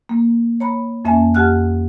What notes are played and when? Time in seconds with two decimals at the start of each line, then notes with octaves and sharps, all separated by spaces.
0.09 A#3
0.60 C#5 A#5 B5
1.05 F2 A#3 C#4 E5 G#5 A5
1.35 F2 G4 F#5 F6 F#6